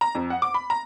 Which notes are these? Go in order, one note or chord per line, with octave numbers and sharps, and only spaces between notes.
A#5
F2
F#5
D6
B5
A#5